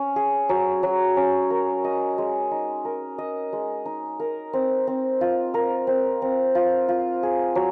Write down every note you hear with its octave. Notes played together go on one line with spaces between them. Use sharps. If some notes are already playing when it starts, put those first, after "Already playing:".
Already playing: C#4
G#4
F#3
F#3
C#4
A#4
D#5
G#3
D#4
A#4
D#5
G#3
D#4
A#4
C4
C4
F4
A#4
C4
C4
F4
F4
G#4
F#3